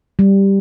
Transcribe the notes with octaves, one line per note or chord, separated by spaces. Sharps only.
G3